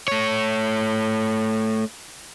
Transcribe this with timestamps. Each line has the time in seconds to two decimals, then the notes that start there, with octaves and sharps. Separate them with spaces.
0.08 A3 C#5